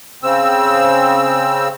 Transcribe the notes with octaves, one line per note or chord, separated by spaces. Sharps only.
C#3 C4 E6